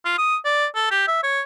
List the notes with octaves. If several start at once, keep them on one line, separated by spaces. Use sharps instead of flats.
F4
D#6
D5
A4
G4
E5
C#5